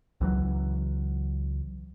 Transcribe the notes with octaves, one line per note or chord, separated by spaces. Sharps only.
C#2 E3 F#3